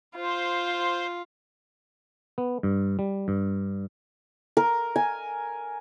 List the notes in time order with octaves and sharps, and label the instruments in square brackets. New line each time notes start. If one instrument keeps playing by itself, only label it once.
[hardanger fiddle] F4 [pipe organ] C5
[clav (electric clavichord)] B3
G2
G3
G2
[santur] A#4
G#5